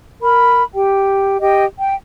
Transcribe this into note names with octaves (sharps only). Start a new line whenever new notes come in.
A#4 B5
G4 G5
G4 D#5 G5
G5